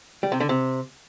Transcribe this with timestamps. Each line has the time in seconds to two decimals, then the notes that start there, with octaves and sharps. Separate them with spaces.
0.23 G3
0.32 C3
0.40 D3
0.49 C3